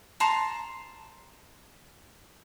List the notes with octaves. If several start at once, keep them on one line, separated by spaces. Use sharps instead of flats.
A5 A#5 C6